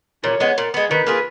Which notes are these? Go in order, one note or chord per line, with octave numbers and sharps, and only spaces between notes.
A#2 C#5
G#3 B3
A#2
G#3 B3
D#3 B4
A#3 F4 G#4